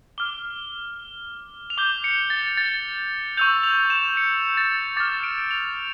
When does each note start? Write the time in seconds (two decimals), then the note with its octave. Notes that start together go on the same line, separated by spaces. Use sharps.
0.18 D6 F6 G7
1.70 F7
1.78 D6 G6 G7
2.04 C#7
2.30 A6
2.57 A6
3.37 C#6 E6 G6 F7
3.63 F7
3.90 E7
4.17 C#7
4.57 A6
4.96 D6 A6
5.00 F6
5.23 D7
5.51 F7